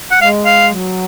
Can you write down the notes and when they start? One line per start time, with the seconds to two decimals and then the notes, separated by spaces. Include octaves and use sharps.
0.11 F#5
0.21 G#3 F5
0.46 F5
0.70 F#3